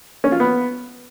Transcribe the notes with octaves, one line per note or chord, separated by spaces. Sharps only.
C#4
F4
B3